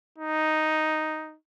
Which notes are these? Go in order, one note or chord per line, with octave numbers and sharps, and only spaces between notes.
D#4